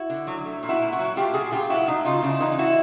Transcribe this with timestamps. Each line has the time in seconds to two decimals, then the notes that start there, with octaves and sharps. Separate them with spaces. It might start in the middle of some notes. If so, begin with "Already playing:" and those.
Already playing: E4 F#4
0.10 D3
0.27 F#3
0.46 A3
0.63 A#2
0.69 E4 F#4
0.81 A#2
0.92 E4 F#4
0.99 F#3
1.16 A3 F4 G4
1.34 A#2 F#4 G#4
1.52 A#2 F4 G4
1.70 F#3 E4 F#4
1.87 A3 D#4 F4
2.05 C#3 D#4 F4
2.23 C#3 D4 E4
2.40 E3 D#4 F4
2.59 A3 E4 F#4